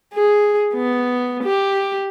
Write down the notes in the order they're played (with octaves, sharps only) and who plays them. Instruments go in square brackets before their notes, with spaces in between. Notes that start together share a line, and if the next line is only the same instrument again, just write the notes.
[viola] G#4
B3
G4